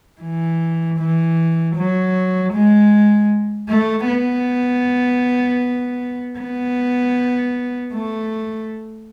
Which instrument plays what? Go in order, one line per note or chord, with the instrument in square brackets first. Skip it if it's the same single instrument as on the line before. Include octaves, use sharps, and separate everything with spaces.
[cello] E3
E3
F#3
G#3
A3
B3
B3
A3